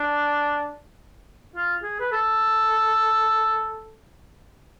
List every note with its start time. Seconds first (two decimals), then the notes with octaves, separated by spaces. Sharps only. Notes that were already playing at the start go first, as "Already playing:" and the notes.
Already playing: D4
1.56 F4
1.83 G#4
2.00 B4
2.12 A4